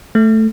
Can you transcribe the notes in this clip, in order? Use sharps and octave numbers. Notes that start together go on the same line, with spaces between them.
A3